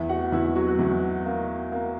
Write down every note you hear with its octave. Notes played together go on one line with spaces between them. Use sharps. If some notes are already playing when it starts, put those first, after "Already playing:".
Already playing: E2 E4 E5
F#4 F#5
E2 E4 E5
F#3 F#4
F#4
E2 E4
A#3
A#3